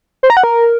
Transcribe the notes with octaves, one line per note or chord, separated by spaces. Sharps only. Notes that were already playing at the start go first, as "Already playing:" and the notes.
C5
A#5
F#5
A#4